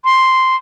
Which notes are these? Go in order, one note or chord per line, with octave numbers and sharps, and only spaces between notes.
C6